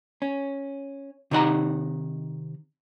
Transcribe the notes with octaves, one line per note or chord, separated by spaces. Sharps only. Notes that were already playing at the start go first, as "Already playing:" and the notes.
C#4
C3 D#3 D#4 G4 F#5 A#5